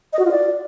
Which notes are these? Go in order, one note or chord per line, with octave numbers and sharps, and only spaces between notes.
D#5
F#4
F4
D5